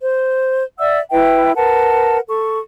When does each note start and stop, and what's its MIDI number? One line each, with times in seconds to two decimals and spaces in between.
0.02 0.63 72
0.78 0.99 74
0.78 0.99 76
0.78 0.99 78
0.78 0.99 88
1.10 1.53 64
1.10 1.53 71
1.10 1.53 76
1.10 1.53 79
1.55 2.19 70
1.55 2.19 71
1.55 2.19 78
1.55 2.19 81
2.28 2.59 69
2.28 2.59 85